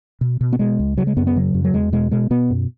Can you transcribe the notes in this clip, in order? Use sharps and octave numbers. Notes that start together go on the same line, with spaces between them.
B2
B2
B3
B2 G#3
C#2
C#3 F#3
G#3
F#2 B3
B3
C#3 F#3
F#2
F#3
E2 G#3
B2 G#3
B2 G#3
B2 B3
F#2